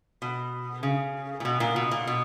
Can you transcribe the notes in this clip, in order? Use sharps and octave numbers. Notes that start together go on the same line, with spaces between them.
B2
C#3
A#2
B2
A#2
B2
A#2
B2